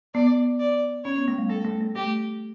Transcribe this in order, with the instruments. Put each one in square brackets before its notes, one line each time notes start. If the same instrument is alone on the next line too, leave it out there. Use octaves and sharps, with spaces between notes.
[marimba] B3 [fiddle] D5
[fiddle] D5
[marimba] C#4 [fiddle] C#5
[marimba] B3
A3
G3
[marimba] A3 [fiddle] A4
[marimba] A3
A3
[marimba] A3 [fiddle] G4